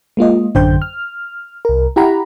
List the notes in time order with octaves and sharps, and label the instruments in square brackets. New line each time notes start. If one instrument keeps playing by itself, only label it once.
[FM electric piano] G#3 A#3 F4 D#5
A1 F#2 D3 C5 G5 G6
F6
C2 A#4
E4 G4 F#5 A#5 B5